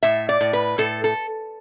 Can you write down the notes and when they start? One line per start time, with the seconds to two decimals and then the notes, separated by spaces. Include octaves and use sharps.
0.03 A2 E5
0.29 D5
0.41 A2
0.53 B4
0.78 A2 A4
1.04 A4